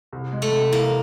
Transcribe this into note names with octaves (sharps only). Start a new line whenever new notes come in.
C2
G#3
A3
C3
E3 A#3